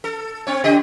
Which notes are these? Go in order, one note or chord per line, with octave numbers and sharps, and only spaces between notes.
A4
C4 C#5
C#3 G4 D#5